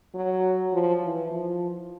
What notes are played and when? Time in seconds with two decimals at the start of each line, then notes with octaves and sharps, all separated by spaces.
0.15 F#3
0.73 F3
1.03 E3
1.32 F3